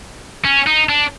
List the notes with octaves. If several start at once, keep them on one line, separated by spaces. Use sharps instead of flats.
C#4
D#4
D4